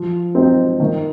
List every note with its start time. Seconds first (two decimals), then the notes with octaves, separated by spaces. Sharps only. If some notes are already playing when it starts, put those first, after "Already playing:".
Already playing: F3
0.35 C4 D#4
0.80 D#3